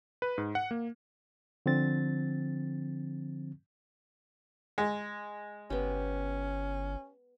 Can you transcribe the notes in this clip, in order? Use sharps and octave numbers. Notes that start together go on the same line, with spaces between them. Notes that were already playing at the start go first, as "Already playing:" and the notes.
B4
G#2
F#5
A#3
D3 F3 C4 A6
G#3
G1 B3 C#4 G4